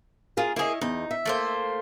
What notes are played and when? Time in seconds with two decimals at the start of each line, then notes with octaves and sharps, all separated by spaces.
0.37 F4 G#4 A#4
0.56 A#3 E4 G#4 C#5 D#5
0.81 E2 D#4
1.11 E5
1.25 A3 A#3 C5